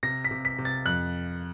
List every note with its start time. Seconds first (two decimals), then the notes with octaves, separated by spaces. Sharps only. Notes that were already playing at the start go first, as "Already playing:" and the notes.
0.03 C3 A#6
0.24 B6
0.31 C3
0.45 B6
0.58 C3
0.65 A6
0.86 F2 F#6